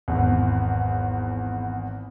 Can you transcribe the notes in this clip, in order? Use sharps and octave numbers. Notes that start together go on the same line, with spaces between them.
G#1 E2